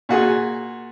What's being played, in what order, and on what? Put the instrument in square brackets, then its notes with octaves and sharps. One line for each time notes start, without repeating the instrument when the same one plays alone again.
[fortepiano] A#2 F#4 G#4